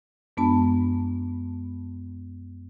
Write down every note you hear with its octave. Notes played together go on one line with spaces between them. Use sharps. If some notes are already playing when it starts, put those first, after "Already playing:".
F#2 G#3 B3 D4 A5 B5